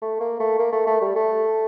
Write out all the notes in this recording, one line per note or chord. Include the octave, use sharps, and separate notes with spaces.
A3
A#3
A3
A#3
A3
A3
G3
A3